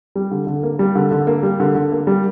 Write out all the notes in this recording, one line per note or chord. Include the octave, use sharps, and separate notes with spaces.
G3
D3
D3
A#3
G3
D3
D3
A#3
G3
D3
D3
A#3
G3